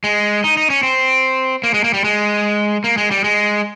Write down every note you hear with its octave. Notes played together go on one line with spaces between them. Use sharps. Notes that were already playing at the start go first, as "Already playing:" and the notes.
G#3
D#4
D#4
C#4
C4
A#3
G#3
A#3
G3
G#3
A#3
G#3
G3
G#3